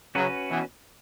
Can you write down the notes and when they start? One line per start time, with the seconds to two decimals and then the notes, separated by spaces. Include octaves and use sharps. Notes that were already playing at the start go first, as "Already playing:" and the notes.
0.15 C#3 F#3 C#4 F#4 B4
0.50 B2 E3